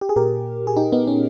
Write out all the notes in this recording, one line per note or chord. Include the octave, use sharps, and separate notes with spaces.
G4
G#4
A#2 G4 A#4
G#4
D#4 G4
B3 D#4
C#4